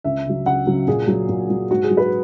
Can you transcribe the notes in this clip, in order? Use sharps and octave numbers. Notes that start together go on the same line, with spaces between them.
C#2 E5
C#3 F#3
C#2 F#5
C#3 F#3
A#2 G#4
F#3
A#2
F#3
G#2 F#4
G#4
F#3
B4